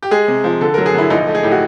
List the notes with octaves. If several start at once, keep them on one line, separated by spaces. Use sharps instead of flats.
G4
G#3 G#4
C3
F3
D3 A4
F#3 A#4
G#4
D3 E4
A#1 D#4
A3
G#4
A2 G4
F#4